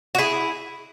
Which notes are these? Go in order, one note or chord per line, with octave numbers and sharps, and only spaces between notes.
F#4
E4 G#4